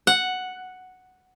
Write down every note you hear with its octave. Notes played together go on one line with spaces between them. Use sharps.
F#5